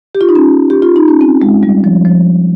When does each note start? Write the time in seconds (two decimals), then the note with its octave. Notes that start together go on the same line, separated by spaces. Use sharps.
0.15 G4
0.21 F4
0.29 D#4
0.35 C#4
0.70 G4
0.82 F4
0.96 D#4
1.08 C#4
1.21 C4
1.42 G#3
1.63 G3
1.84 F3
2.05 F3